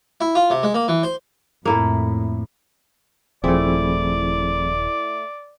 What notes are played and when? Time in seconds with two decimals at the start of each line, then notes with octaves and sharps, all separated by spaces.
0.21 E4
0.35 F4
0.50 C3
0.63 G#3
0.74 A#3
0.88 E3
1.03 C5
1.65 F2 A2 A#3 E4 A4
3.44 D#1 F3 A3 C4 E4 G#4 D5